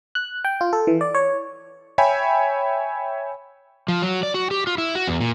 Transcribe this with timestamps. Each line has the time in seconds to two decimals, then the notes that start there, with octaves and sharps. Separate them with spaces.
0.15 F#6
0.45 G5
0.61 F4
0.73 A4
0.87 E3
1.01 D5
1.15 C#5
1.98 C#5 E5 G5 G#5 B5
3.88 F3
4.02 F#3
4.23 D5
4.34 F#4
4.51 G4
4.67 F4
4.78 E4
4.95 F#4
5.07 E2
5.21 A#2